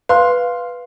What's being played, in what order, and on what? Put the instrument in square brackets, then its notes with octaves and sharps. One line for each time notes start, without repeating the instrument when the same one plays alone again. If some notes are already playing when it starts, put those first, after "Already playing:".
[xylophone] B4 [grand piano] F5 C6